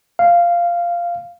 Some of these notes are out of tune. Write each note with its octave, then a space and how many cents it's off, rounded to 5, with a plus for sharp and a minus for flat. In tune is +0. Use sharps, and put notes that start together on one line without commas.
F5 -10